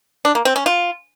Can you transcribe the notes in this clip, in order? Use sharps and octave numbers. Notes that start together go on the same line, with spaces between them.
D4
A#3
C4
C#4
F4